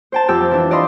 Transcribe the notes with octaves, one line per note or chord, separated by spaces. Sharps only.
C5 G5 A5
F2 G4 G5 E6
E3 D4
D5 D#5 F5 B5 C6